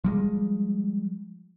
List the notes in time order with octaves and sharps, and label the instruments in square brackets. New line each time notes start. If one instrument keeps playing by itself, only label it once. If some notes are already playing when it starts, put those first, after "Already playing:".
[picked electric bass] F3 G3 G#3